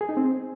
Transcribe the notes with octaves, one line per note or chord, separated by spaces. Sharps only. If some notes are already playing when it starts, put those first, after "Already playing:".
G#4
D#4
C4